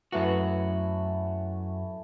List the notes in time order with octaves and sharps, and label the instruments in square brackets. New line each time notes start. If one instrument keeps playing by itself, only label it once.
[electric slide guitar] F#2 F#4 [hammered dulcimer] E3 A3 E4